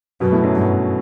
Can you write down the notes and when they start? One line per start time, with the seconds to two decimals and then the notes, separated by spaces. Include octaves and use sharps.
0.20 F#2 B2 B3
0.32 A2 A3
0.43 F#2 F#3
0.55 G2